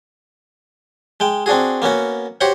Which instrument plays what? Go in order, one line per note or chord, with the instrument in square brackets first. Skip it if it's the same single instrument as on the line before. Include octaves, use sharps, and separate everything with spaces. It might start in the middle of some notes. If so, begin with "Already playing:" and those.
[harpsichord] G#3 G5
C4 D4 F#4 G#4
A#3 B3 C#4 F#4
F#4 G4 C5 C#5 F#5